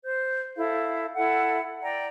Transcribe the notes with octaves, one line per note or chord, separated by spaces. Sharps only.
C5 G6
E4 A4 F5
E4 A4 F#5
D5 G5 A#5